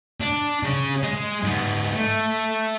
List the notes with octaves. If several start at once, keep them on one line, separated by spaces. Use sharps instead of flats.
D4
C#3 C#4
G#3
G#2 B3
A3